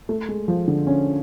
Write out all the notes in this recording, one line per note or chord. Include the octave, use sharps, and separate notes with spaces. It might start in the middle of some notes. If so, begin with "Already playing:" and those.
A3
G#3
F3
D3
C#4